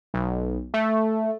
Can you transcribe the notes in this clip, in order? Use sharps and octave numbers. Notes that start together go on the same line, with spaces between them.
B1
A3